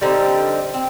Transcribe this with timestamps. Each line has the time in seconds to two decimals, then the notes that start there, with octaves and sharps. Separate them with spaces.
0.01 D3 G3 C4 D#4
0.74 C4